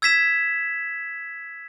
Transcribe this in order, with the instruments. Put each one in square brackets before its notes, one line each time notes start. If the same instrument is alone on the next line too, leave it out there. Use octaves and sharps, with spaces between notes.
[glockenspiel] E6 G#6 B6 E7